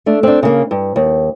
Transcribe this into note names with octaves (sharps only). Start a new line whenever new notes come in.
A3 D4
C4 D4
C#3 A#3
G2
D#2